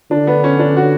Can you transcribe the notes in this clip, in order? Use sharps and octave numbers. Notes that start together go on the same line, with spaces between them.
D3 D4
B3
C#4
D4
F#4